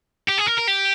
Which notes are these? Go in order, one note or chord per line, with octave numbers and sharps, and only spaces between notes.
G4
G#4
A#4
A#4
G4